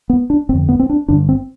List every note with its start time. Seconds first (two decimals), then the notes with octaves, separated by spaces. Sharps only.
0.10 B3
0.30 D4
0.49 G1 F2 D3 C4
0.69 B3
0.80 C4
0.90 D4
1.08 G1 G2 D3 D4
1.29 C4